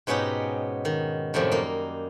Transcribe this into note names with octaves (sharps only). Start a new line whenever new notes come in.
G#2 B2 B3 C#4 D#4 G4
D#3
F#2 A2 C3 F3 G3
A#3 D#4